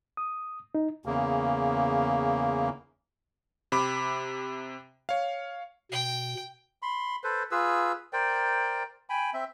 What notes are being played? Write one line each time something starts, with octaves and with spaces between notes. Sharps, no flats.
D#6
D#4
E2 C#3 A#3
C3 B5 D6
C#5 F5
B2 G5
B5 C6
A4 B4 C5
F4 G#4 B4 E6
A#4 C5 D5 G5
G5 G#5 B5
C4 E5